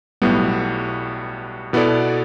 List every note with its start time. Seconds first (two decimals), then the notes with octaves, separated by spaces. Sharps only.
0.22 B1 A2 G3 B3
1.73 B2 B3 E4 A4 D5